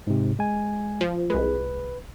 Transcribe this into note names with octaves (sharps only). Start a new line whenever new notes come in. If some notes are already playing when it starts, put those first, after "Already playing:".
G#2 C3
G#3 G#5
F3
C2 G#3 B4